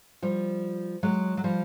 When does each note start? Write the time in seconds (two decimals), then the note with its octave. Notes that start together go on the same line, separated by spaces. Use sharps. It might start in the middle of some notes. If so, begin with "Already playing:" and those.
0.22 F3 G3
1.03 F#3 G#3
1.37 F#3
1.44 F3 G3